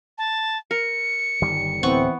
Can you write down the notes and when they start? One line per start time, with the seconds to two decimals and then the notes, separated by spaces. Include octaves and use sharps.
0.18 A5
0.71 A#4 C#7
1.42 G1 D#3 G3
1.83 D1 E3 B3 C4 F#5 C#6